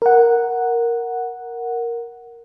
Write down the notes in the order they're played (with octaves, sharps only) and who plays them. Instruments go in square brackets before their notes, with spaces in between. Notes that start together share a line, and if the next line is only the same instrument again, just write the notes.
[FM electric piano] A#4 F#5